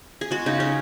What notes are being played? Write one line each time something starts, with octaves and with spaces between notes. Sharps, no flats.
G#4
G#3 F#4
C#3 D#4
C#3 C#4